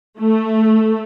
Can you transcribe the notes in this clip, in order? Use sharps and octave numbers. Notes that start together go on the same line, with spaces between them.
A3